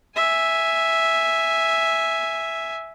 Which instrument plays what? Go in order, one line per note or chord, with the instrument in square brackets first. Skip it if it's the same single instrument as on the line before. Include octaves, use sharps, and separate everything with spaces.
[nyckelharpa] E5 G#5